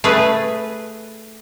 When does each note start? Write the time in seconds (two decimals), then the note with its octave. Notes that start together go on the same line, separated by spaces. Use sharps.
0.04 A3 G#4 B4